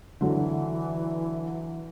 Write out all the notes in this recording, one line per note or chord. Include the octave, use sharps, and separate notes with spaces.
D3 E3 F#3